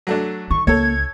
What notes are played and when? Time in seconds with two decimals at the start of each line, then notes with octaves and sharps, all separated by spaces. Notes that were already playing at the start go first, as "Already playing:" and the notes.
0.07 F#3 A3 D4
0.50 D#3 C#6
0.67 C#2 A#3 A4 C#5 G#6